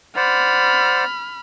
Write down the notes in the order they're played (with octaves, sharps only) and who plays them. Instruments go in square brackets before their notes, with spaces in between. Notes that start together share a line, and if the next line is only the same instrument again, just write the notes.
[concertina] C5 D5 F#5 [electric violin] B5 F6